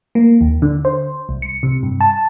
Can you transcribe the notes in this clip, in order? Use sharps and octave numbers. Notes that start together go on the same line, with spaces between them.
A#3
D#2
D3
C5
C2
C#7
C3
G2
A5